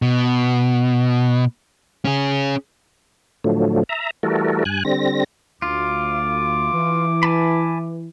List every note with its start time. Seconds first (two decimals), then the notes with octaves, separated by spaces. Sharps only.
0.02 B2
2.05 C#4 G#4
3.44 A2 D3 F3 F#3 A3
3.89 E5 A#5
4.23 E3 G3 A3 F#4 A4 A#4
4.65 G2 G#5 F#6
4.85 D3 G3 C4 A#6
5.62 D2 F4 D6
6.72 E3
7.23 G#5 A5 B5